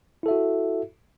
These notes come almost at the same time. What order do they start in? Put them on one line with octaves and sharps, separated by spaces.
E4 A4 E5 F#4